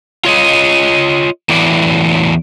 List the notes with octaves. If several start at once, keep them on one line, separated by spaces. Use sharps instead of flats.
F4 C#5 D#5
E2 A2 E3 F#3 D5